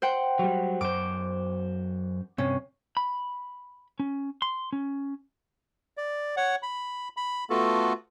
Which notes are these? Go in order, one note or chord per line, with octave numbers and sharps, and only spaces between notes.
C5 F#5 G5
F#3 G3
F#2 C5 D6
G2 C3 C#4
B5
C#4
C6
C#4
D5
C#5 F#5
B5
B5
A3 B3 F4 F#4 A4